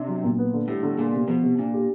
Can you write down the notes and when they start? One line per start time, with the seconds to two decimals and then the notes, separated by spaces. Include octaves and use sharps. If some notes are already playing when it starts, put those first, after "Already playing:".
Already playing: C3 D4
0.08 F#3
0.23 A#2
0.39 B3
0.54 D3
0.68 A2 G3
0.83 D3
0.98 A#2 G#3
1.13 C3
1.28 B2 F3
1.43 C3
1.58 A#2 D4
1.74 G4